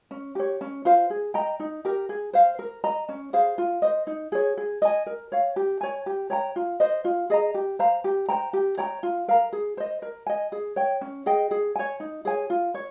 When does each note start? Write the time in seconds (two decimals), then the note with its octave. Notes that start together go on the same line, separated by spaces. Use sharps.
0.11 C#4
0.35 G4 C#5
0.61 C#4
0.85 F4 C5 F5
1.10 G#4
1.34 D#5 G5 A#5
1.60 D#4
1.85 G4 A#4
2.09 G#4
2.33 C5 F5
2.59 A#4
2.84 D#5 A#5
3.09 C#4
3.33 G#4 C5 F5
3.58 F4
3.82 C5 D#5
4.07 D#4
4.32 G#4 C#5
4.57 G#4
4.82 D#5 G#5
5.06 A#4
5.32 C#5 F5
5.56 G4
5.81 C#5 G#5
6.06 G4
6.30 C#5 G5 A#5
6.56 F4
6.80 C5 D#5
7.04 F4
7.30 G#4 D#5 A#5
7.54 G4
7.79 C5 F5 A#5
8.04 G4
8.28 C5 G5 A#5
8.53 G4
8.78 C#5 G5 A#5
9.03 F4
9.28 A#4 F5 A#5
9.53 G#4
9.77 C5 D#5
10.02 A#4
10.27 D#5 G#5
10.52 G#4
10.76 C#5 G5
11.01 C#4
11.26 G#4 D#5 G5
11.51 G#4
11.76 C#5 G#5
12.00 D#4
12.25 G#4 C#5 G#5
12.50 F4
12.74 C#5